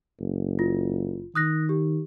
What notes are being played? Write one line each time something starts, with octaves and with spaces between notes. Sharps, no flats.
F#1
F4
D#3 D#6 F#6 A#6
G4